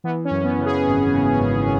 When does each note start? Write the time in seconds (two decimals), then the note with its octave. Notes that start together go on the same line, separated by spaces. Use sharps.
0.04 E3 B3
0.25 C#4
0.31 F#2
0.44 B3
0.59 C#3
0.66 G#4
0.86 G#1
1.14 C#3
1.40 G#1